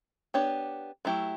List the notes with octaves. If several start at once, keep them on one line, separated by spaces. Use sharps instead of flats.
B3 D4 G4 C#5
F#3 A3 E4 G4